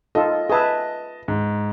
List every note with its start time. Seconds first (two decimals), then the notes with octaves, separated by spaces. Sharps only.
0.15 D#4 F4 A4 D#5
0.50 G#4 B4 D#5 E5 A5
1.28 G#2